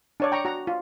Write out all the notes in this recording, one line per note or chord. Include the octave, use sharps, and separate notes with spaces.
D4 C#5 D5
G5 A#5 C#6
F#4 A#5
F4